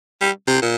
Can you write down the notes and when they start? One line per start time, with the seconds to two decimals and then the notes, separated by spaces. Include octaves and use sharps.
0.21 G3
0.48 C3
0.62 A#2